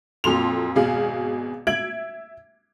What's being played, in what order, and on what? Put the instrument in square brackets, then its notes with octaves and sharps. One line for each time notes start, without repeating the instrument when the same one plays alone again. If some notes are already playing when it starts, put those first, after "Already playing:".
[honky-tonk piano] F2 A#2 F#3 A4 C6 F7
G#1 B2 G#4 F5
E5 G#6 D7 F#7